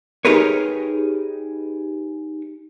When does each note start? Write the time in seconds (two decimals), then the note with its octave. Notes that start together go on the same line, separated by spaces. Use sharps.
0.25 D#4 G4 G#4 A#4 B4 C#5